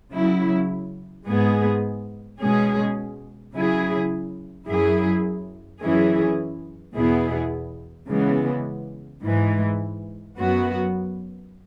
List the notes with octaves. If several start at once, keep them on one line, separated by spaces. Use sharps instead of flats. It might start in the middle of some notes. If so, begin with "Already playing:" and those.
C#3 F#3 E4
G#2 G#3 B3 G#4
B2 G#3 C#4 G#4
C#3 F#3 E4 G#4
F#2 F#3 E4 G#4
F#2 E3 C#4 E4 G#4
E2 B2 B3 E4 G#4
C#3 E3 G#3 B3
G#2 E3 G#3
F#2 F#3 B3 F#4